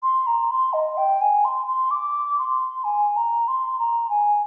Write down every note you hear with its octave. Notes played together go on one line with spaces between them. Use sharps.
C6
A#5
C6
D#5
G5
G#5
C6
C6
D6
C6
G#5
A#5
C6
A#5
G#5